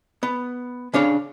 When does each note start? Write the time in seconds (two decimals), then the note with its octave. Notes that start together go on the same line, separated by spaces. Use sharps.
0.23 B3
0.94 C#3 D4 C#5 F5